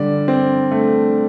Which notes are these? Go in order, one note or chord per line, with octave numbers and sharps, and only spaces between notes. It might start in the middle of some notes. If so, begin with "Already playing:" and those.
Already playing: D3 G3 D5
C4
A3